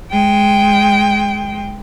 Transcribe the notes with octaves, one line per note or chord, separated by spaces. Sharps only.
G#3 G5